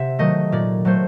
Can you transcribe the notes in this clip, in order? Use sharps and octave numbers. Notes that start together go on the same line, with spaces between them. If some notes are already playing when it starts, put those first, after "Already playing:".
Already playing: C3 E5 F#5
D#3 F#3 A3 D#5
A#2 D5
F#3 A3 C5